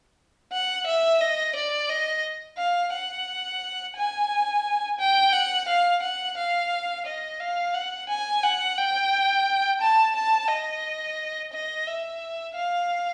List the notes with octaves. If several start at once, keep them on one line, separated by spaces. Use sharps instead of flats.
F#5
E5
D#5
D5
D#5
F5
F#5
G#5
G5
F#5
F5
F#5
F5
D#5
F5
F#5
G#5
F#5
G5
A5
A5
D#5
D#5
E5
F5